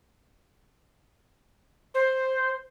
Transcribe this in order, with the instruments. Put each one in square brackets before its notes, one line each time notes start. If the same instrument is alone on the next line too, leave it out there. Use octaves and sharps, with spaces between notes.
[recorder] C5